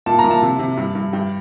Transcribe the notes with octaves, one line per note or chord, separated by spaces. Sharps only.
A#2 A5
A#5
A#2
A5
C3
C3
G2
G2
G2 G5